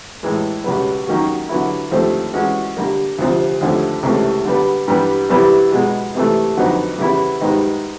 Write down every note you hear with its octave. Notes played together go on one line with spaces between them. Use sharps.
A2 E3 G#3
C#2 B2 G3 B3
D#3 F#3 A#3 C#4 F#4
D3 F#3 B3 E4
D#2 D3 F3 A3 C4
E3 G#3 C#4 F#4
D3 G3 A#3
D2 C3 F3
D#2 D3 F3 A3
C#2 C3 E3 A3
D3 G3 B3
G2 E3 G3 B3
C3 E3 G3 B3 E4
B2 G#3 B3
C3 E3 A3
F2 D3 F#3 B3 D#4
C#3 E3 G3 B3 E4
G#2 D#3 G3 B3 D#4